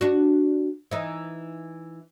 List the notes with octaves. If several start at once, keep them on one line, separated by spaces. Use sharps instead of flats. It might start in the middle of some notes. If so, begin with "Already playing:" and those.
D4 F#4
E3 D#4